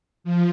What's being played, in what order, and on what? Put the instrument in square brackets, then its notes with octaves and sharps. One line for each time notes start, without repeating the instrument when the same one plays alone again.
[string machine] F3